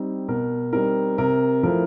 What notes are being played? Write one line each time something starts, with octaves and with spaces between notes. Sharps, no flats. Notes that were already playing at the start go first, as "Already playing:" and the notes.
Already playing: G3 C4 D#4
B2 A#4
G3 C4 D#4 A#4
C3 A#4
F3 A3 C4 E4 A#4